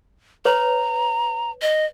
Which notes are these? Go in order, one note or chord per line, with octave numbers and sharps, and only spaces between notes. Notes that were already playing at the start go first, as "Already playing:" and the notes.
B4 C#5 A#5
D#5